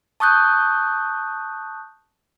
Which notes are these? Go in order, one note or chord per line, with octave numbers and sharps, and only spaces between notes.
A5 C#6 D#6 F#6 G6